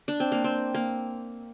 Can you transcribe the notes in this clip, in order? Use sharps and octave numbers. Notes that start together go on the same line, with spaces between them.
D4
C4
A#3
C4
A#3